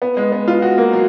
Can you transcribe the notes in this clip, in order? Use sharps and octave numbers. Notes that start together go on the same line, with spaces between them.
B3
G#3
B3
F4
F#4
A#3
F#3